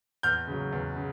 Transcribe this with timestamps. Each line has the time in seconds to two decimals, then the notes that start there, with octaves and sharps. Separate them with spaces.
0.23 E2 F6 G6
0.47 C#3 F#3
0.72 E2
0.96 C#3